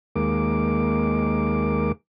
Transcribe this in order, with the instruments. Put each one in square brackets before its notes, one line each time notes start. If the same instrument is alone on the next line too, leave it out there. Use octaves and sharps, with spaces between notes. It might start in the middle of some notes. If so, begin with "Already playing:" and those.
[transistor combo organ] D#2 G#3 A#3 D6